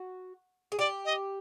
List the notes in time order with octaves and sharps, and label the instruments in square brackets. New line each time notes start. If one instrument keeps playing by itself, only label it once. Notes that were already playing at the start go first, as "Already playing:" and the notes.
Already playing: [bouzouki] F#4
G#4
[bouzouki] G4 [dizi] D5
[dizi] D#5